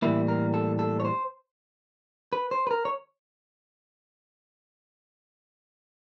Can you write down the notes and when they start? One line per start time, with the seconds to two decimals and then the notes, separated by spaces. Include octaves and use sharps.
0.02 A2 E3 G3 A#3 E4
0.28 A#4
0.54 A4
0.79 A4
1.00 C#5
1.05 C5
2.33 B4
2.51 C5
2.67 B4
2.71 A#4
2.85 C#5